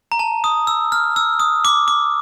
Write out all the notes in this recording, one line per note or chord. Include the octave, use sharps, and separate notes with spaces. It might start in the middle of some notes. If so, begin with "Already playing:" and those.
A#5
A5
D#6
E6
F6
E6
D#6
D6
D6